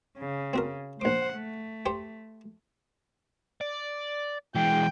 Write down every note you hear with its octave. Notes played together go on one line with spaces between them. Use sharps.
C#3
C4 F#4 A#4
A#1 C5 F#5 D6
A3
G4 C5 C#6
D5
E3 G#3 G5